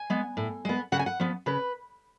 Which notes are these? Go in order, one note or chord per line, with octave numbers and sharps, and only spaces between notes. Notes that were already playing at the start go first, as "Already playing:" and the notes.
Already playing: G#5
G#3 B3
A2
G#3 B3
C#3 F#5
G#5
F#5
F3 B3
C#3 B4